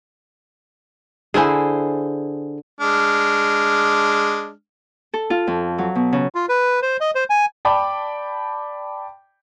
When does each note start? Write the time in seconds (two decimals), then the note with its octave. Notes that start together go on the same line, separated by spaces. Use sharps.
1.34 D3 E4 G#4 C5 G#5
2.81 G#3 D4 F6
5.14 A4
5.30 F4
5.47 F2
5.78 F#3
5.95 B2
6.13 C#3
6.35 F4
6.49 B4
6.82 C5
7.00 D#5
7.15 C5
7.30 G#5
7.65 D5 G5 A5 B5 D6